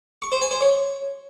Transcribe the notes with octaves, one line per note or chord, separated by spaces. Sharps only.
C#6
C5
G#5
C5
C#5